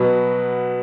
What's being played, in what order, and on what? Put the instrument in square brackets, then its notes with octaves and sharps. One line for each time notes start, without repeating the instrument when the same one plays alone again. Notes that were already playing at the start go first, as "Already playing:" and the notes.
Already playing: [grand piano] B2 F#3 B3 F#4